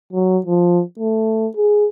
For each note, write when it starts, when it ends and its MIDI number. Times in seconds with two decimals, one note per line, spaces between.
0.12 0.39 54
0.46 0.82 53
0.99 1.47 57
1.56 1.87 68